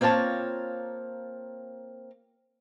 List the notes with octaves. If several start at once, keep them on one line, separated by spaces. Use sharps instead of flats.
A#3 C4 F4 C#5 A5